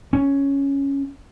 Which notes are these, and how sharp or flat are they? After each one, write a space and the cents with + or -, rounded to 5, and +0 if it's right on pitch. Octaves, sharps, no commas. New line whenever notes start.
C#4 +0